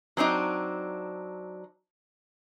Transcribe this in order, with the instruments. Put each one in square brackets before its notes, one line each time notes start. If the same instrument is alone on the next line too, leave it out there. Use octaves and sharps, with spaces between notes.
[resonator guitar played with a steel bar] F#3 C4 D4 D#4